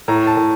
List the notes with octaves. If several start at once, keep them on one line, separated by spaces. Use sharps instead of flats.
A2 A#5
A5
A2